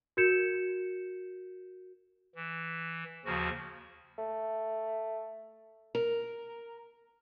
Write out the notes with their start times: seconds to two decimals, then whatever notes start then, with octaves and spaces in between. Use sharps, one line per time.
0.17 F#4 A#4 G6 G#6 C#7 E7
2.35 E3
3.25 D#2 C#3 F3 F#4
4.18 A3
5.95 A#4